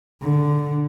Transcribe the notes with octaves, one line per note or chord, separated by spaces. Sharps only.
D3